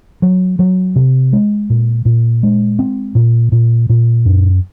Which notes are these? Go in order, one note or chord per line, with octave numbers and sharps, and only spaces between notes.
F#3
F#3
C3
G#3
A#2
A#2
G#3
C4
A#2
A#2
A#2
F#2